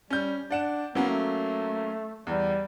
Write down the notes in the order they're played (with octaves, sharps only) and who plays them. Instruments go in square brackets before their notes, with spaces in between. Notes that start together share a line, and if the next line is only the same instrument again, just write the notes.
[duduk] G3 [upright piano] C#4 G6
[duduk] D4 [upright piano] D5 F#5 E7
[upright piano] F#3 A#3 C#4 [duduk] B3
[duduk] A3
[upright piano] E2 [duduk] G3